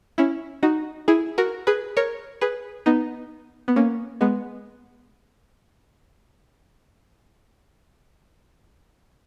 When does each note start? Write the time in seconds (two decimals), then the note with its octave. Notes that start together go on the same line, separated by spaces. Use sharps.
0.18 C#4 E4
0.63 D#4 F#4
1.08 E4 G#4
1.38 F#4 A#4
1.67 G#4 B4
1.97 A#4 C#5
2.41 G#4 B4
2.86 B3 D#4
3.68 B3
3.76 A#3 C#4
4.21 G#3 B3